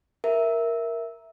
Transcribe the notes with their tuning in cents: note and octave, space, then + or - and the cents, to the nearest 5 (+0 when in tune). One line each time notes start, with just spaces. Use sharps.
A#4 +5 E5 +0